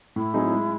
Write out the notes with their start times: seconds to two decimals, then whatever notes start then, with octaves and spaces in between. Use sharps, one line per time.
0.16 A2 E4
0.34 F#3 C4 D#4 G#4
0.52 G#3